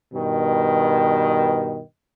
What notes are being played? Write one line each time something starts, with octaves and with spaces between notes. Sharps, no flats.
G2 B2 D#3